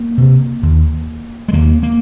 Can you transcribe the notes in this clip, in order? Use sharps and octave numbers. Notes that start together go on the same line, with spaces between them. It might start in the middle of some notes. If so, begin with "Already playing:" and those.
Already playing: A#3
C3
D#2
G#3
D#2 A#3
A#3